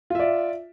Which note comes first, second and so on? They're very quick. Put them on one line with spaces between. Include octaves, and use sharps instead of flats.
F4 E5 D5